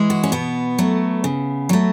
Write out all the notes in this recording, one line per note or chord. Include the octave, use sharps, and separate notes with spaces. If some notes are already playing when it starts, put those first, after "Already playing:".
Already playing: E3 G#3
F#4
C#4
B2 B3
F#3 A3
C#3
F#3 A3